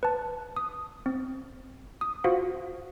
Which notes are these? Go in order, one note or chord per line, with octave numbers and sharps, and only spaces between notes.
B4 A5
D#6
C4
D#6
F4 F#4 C5 F5 F#5